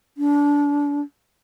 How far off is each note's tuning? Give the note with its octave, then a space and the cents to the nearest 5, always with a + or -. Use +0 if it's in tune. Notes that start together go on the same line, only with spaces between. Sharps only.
D4 -25